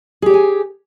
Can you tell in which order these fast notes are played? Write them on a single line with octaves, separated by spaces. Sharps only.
G#4 G4 C#5 G#5